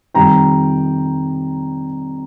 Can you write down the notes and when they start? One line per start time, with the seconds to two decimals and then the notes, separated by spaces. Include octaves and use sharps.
0.14 F2 C3 D#3 G3 G5 A#5